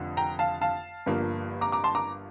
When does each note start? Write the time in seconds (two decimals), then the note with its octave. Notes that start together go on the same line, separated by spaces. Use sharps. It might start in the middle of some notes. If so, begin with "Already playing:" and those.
Already playing: F1 F2 D3
0.17 G5 A#5
0.39 F5 A5
0.61 F5 A5
1.06 G1 G2 F3 A#3
1.61 A#5 D6
1.72 A#5 D6
1.84 A5 C6
1.95 A#5 D6